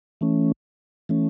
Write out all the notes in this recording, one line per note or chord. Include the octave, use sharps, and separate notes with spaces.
E3 A3 C#4
E3 A3 C#4